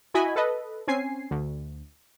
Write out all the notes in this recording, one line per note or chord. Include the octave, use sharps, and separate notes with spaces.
E4 F#4 D#5 G#5 B5
A4 B4 D#5
C4 C#4 G#5 C7
D2